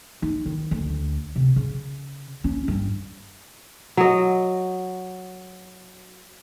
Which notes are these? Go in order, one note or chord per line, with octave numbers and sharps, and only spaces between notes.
D#4
D#3
D2
C3
C#3
C#4
G2
F#3 D#5